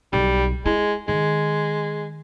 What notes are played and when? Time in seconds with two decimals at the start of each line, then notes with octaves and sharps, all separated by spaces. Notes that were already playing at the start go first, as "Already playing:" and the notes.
0.13 B1 G3
0.66 G#3 E4
1.08 D#3 G#3